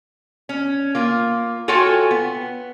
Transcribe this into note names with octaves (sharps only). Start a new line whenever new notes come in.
C#4
A#3 F4
F4 F#4 A4 C#5 G5 G#5
B3